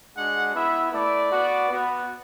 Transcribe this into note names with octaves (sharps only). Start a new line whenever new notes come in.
G#3 D4 F#4 F#5
B3 E4 E5
A3 E4 D5
B3 F#4
B3 F#4